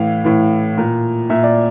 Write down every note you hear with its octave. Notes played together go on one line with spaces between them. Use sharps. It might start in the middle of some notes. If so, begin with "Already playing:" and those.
Already playing: A2 E3 F5
A2 E3
A#2
A#2 E5
D5